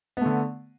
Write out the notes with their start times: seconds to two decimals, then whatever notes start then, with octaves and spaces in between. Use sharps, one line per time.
0.17 B3
0.21 A3
0.26 D3